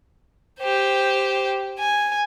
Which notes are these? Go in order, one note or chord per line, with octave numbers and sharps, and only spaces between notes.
G4 C5
G#5